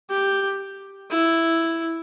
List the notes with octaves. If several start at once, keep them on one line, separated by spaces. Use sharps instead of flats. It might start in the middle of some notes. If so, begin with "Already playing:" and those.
G4
E4